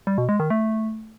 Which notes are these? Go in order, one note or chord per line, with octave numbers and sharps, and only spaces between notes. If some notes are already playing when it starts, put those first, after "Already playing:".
G3
B2
G#3
D#3
A3